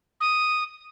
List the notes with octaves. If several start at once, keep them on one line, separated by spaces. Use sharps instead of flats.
D#6